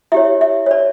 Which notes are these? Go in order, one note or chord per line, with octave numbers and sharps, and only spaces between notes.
E4 G4 C#5 E5
E5
C#5
D5